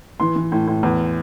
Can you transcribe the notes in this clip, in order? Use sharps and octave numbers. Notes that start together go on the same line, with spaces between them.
E3 C6
E3
A2
A2
E2